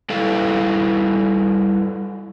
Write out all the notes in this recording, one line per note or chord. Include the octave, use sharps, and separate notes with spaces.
G3 E4 A4 B4 F5